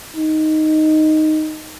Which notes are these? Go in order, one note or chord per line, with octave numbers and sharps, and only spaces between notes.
D#4